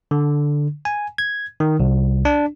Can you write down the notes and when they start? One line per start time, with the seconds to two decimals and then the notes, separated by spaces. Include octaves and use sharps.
0.11 D3
0.85 G#5
1.18 G#6
1.60 D#3
1.80 C2
2.25 D4